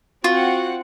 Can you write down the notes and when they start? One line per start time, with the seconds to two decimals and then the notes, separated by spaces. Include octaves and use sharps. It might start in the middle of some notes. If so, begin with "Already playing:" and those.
0.24 C4 F4 F#4 F#5